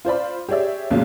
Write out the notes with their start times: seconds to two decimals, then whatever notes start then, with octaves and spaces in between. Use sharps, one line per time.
0.05 F4 C5 D5 B5
0.49 G4 G#4 C#5 D5 E5
0.91 B1 A#2 C#3 F#3 G#3